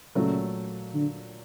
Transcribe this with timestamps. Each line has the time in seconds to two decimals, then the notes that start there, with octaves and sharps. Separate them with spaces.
0.15 A#2 C#3 F#3 A3
0.94 D3